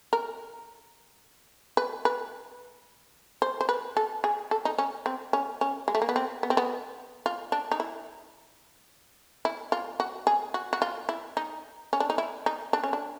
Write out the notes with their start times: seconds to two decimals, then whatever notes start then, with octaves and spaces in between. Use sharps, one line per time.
0.13 A#4
1.77 B4
2.05 B4
3.42 C5
3.61 C5
3.69 B4
3.97 A4
4.24 G#4
4.51 A4
4.65 D#4
4.78 C#4
5.06 C4
5.33 C#4
5.61 C#4
5.88 G#3
5.95 A3
6.02 A#3
6.09 B3
6.16 C4
6.43 B3
6.50 C4
6.57 B3
7.26 F4
7.52 D4
7.71 D#4
7.80 E4
9.45 E4
9.72 F4
10.00 F#4
10.27 G#4
10.54 F#4
10.73 F#4
10.82 F4
11.09 E4
11.37 D#4
11.93 C#4
12.00 D4
12.10 D#4
12.18 E4
12.46 D#4
12.73 D4
12.83 C#4
12.93 D4